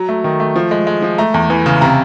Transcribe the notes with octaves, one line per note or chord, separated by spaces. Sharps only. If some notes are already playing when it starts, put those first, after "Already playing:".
Already playing: F#3 A#5
A3
D#3
A3
F3
G#3
G#3
F3
A3 A#5
E2
E3
C#3
C3 A#5